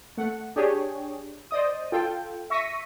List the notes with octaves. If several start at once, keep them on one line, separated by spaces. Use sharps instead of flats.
A3 F#5
D4 G4 G#4 C#5
C5 D5 D#5 D#6
F4 A4 G5
E5 C#6 A#6 B6 D#7